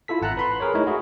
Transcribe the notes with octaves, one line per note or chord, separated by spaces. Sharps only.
E4 F4 A4 B6
G#1 F#5 A5 A#5 F#6
B4 B5 C6
G#4 A#4 B4 C#5
G#3 A3 D#4 E4 C#5
F#4 G#4